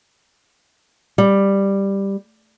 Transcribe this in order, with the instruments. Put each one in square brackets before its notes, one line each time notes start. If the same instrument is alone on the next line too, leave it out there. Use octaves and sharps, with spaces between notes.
[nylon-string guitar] G3